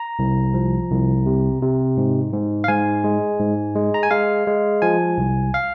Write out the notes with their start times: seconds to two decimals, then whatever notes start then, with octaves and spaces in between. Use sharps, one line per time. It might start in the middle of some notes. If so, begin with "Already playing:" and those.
Already playing: A#5
0.19 C2
0.54 F3
0.90 C2
1.26 C3
1.62 C3
1.97 G#2
2.33 G#2
2.64 F5
2.68 G#2 G#5
3.04 G#3
3.40 G#2
3.75 G#3
3.94 A#5
4.03 G#5
4.11 G#3 F5
4.47 G#3
4.82 F3 G#5
5.18 C2
5.54 F5